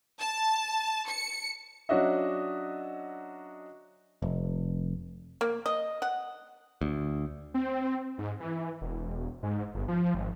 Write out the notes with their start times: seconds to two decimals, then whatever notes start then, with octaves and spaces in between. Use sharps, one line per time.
0.19 A5
1.09 C#7
1.89 F#3 C#4 D4 F#4 D#5 E5
4.22 F1
5.41 A#3
5.66 D#5
6.02 F#5
6.81 D2
7.54 C4
8.18 G#2
8.40 E3
8.81 E1
9.43 G#2
9.74 G1
9.88 F3
10.15 G#1